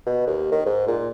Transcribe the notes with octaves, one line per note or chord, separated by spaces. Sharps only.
B2
D#2
D#3
G#2
A#2